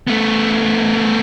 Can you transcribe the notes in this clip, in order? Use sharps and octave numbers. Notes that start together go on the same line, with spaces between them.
A3 B3